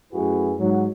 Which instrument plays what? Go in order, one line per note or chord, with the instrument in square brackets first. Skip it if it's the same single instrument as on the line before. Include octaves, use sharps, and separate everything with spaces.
[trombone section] F#2 A3 E4 F#4 G#4 B4
G#2 F#3